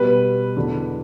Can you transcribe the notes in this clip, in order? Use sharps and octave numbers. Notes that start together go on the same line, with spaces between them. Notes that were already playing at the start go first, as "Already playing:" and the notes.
Already playing: B2 G3 B4
E2 D3 F#3